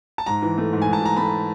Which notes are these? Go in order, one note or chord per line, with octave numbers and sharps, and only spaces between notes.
A5
G#2 A#5
E3
A3
G#2
G#5
G#2
A5
E3 A#5
A3 B5